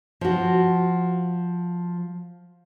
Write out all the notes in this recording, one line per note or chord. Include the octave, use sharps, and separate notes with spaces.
F3 F#4